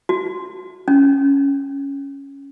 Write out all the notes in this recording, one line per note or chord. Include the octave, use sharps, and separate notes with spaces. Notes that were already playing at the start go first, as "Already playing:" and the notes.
F#4
C#4